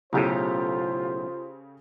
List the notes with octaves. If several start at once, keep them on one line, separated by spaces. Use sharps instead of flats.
B1 A2 C#3 F4 G4 A4 C5